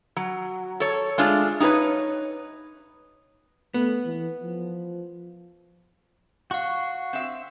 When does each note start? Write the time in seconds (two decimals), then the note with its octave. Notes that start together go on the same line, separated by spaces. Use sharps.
0.16 F#3
0.80 A4 C#5
1.18 G#3 A3 D4 F4
1.60 D#4 G4 G#4 B4 C#5
3.74 A3 B3
4.05 E3
4.40 F3
6.51 F#4 F5 C#6
7.13 C4 E5